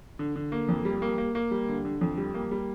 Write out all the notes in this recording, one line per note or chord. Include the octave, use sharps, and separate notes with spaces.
D3
D3
A#3
F2
G3
A#3
A#3
A#3
G3
D3
D3
F2
G3
A#3
G3